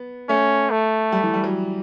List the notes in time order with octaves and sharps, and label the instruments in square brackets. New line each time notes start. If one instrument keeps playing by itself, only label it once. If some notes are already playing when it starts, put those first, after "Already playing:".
Already playing: [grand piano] B3
[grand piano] A3 [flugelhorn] C#4
[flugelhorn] A3
[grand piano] G3
E3
G3
F#3